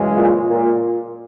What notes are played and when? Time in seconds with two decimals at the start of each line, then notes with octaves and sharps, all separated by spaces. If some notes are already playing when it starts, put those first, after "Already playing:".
Already playing: F#2 C#3 E3 G#3
0.15 A#2
0.49 A#2